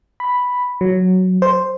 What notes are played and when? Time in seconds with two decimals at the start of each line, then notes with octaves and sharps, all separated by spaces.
0.20 B5
0.81 F#3
1.42 C5